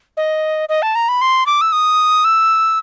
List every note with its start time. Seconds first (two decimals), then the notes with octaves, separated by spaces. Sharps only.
0.17 D#5
0.69 D#5
0.82 A5
0.95 A#5
1.09 B5
1.21 C6
1.46 D6
1.61 E6
1.72 D#6
2.25 E6